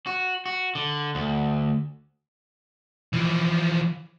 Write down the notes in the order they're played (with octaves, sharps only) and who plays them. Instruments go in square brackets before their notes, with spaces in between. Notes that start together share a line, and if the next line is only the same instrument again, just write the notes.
[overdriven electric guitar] F#4
F#4
D3
D2
[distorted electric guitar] E3 F3